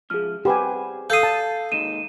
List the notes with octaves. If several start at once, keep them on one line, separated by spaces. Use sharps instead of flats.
C#2 G#2 F3 G#4 F6
G4 G#4 B4 C5 F#5 G#5 B5
A4 F5 D#6 G6 C7
A5
D#2 G#3 D#4 D#7 E7